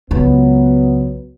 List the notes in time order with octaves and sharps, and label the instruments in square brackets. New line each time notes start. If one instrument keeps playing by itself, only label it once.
[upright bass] C#2 G#3 [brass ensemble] F#3 B3